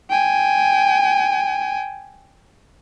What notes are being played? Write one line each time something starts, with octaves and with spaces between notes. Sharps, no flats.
G5 G#5